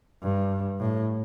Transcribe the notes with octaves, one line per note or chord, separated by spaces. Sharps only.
G2
A2